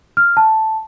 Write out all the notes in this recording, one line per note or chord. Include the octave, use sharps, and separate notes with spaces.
F6
A5